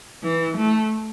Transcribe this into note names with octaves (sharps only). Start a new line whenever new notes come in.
E3
A3